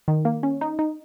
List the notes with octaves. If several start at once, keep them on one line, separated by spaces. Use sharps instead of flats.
D#3
A#3
C#4
D#4
D#4